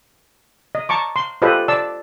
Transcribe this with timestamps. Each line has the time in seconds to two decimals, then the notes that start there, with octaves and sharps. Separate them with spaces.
0.75 D#5
0.89 A5 A#5 C#6 D6
1.16 C6
1.42 F4 G4 A4 B4 C5 D#5
1.68 D5 A5 E6